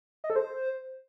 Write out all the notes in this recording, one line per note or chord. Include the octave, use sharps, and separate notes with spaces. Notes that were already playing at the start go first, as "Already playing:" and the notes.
D#5
A4
C5